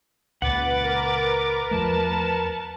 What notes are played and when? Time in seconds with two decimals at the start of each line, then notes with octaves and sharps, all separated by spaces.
0.42 C#2 A#2 C#3 B4 F#5 D6 A6
0.81 A#4 B4
1.71 E2 F3 A3 A5